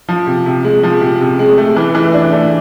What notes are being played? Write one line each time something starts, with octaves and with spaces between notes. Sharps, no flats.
F3
C3
C3
G#3
F3
C3
C3
G#3
A3
E3
E3
D4
A3